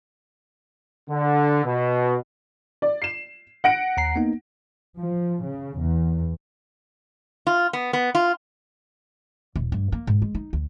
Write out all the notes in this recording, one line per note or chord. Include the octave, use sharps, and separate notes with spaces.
D3
B2
D5
C7 E7
F#5 A#6 D7
D#2 A#5 C7
A#3 B3 D#4
F3
C#3
E2
F4
B3
B3
F4
D#1
G2
A#3
G#2
G#3
D#4
D2